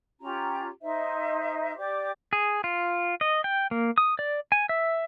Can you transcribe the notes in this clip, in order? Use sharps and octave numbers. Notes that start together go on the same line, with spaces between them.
C#4 F4 G4 A#5
D#4 C5 D#5 E5
G4 D5 D6
G#4
F4
D#5
G5
A#3
D#6
D5
G#5
E5